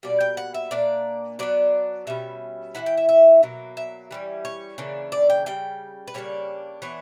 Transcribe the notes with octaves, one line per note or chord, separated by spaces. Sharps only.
B2 G3 A#3 D5
G5
F#5
E5
A#2 A#3 D4 D5
F#3 B3 D4 D5
B2 G3 C#4 E5
E3 A#3 E4 F#5
G5
E5
E5
B2 F#3 A#3
E5
E3 G3 C#4
C#5
C#3 E3 A#3 D4
D5
G5
C#3 G3 G5
B4
C#3 G3 A#3 D4 C#5
E3 B3 D4 C#5